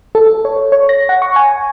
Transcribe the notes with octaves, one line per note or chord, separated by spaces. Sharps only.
A4
C#5
C#5
A#6
F#5
C#6
G#5